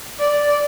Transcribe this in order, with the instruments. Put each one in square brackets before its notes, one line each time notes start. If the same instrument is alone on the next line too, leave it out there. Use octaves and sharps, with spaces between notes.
[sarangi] D5